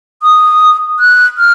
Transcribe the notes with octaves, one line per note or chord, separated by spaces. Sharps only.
D#6
F#6
F6